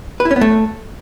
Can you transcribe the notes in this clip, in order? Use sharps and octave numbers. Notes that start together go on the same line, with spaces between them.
B4
E4
C#4
B3
A3